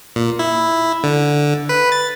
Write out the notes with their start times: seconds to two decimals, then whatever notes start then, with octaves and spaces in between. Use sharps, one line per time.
0.16 A#2
0.39 E4
1.04 D3
1.69 B4
1.92 A6